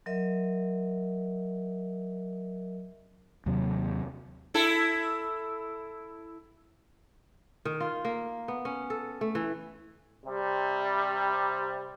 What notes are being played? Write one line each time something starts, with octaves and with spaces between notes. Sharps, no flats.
F#3 A#4 D#5 E5
D#2 C3 F#3
E4 A4
D#3
F4
A#3
B3
C#4
A4
A3
E3
C3 G3